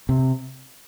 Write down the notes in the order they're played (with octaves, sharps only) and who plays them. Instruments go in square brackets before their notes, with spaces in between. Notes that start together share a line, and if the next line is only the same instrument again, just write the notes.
[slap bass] C3